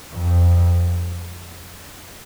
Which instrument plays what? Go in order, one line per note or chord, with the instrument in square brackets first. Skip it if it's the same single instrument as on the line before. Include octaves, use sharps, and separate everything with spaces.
[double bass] F2